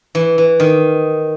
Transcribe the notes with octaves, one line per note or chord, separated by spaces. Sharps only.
E3
E3
D#3